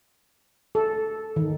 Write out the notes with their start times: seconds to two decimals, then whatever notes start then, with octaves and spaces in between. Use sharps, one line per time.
0.75 A4
1.36 D#3